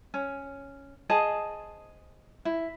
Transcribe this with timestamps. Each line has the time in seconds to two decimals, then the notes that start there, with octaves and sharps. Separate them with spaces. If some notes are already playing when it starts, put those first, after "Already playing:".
0.14 C#4
1.09 G#4 C5 D#5 A5
2.45 E4